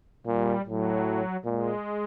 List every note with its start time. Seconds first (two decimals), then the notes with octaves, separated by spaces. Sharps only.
0.26 A#2 G3
0.66 A2 F#3
1.44 A#2 G#3